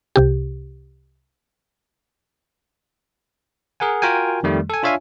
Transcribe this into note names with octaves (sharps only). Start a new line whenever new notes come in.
C2 C3 G4
G#4 A#4 F#5 G#5
F4 F#4 A#4 G5 G#5
F2 D#3 G3 A3
A4 G#5
D4 F4 C#5 E5 F5 G#5